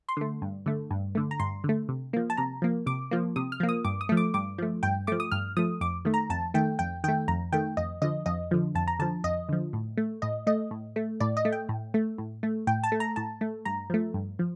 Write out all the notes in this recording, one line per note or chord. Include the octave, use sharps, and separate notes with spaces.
C6
D3 A3
G2
D3 A3
G2
D3 A3
A#5
G2 C6
D3
A3
C3
F3 A#3
A5
C3 A#5
F3 A#3
C3 D6
F3 A#3
C3 D#6
F6
F3 A#3
D#6
G2 D6
D#6
F3 A3
D6
G2 D6
F3 A3
G2 G5
F3 A3 D6
D#6
G2 F6
F3 A3 D#6
F2 D6
D#3 A3
A#5
F2 A5
D#3 A3 G5
F2 G5
D#3 A3 G5
F2 A#5
D#3 A3 G5
F2 D#5
D3 F3 D#5
F2 D#5
D3 F3
F2 A5
A#5
D3 F3 A5
F2 D#5
D3 F3
A2
A3
A2 D#5
A3 D#5
A2
A3
A2 D5
D#5
A3
G5
A2
A3
A2
A3
A2 G5
A5
A3
A#5
A2 A5
A3
G2 A#5
F3 A3
G2
F3